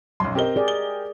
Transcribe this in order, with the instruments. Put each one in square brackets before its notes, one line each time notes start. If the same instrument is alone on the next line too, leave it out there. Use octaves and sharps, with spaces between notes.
[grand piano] B1 F#2 [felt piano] C6
[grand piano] C4 G7 [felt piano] G4 A#4 D#5
[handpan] G#4 D5
[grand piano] G7